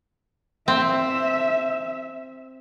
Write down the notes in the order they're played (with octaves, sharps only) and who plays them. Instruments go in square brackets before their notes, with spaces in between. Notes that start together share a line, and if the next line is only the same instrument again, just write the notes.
[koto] C4 [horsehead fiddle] E5